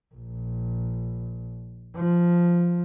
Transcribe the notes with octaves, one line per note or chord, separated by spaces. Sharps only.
A#1
F3